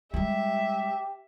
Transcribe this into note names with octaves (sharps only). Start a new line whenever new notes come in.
G3 G#3 G4 E5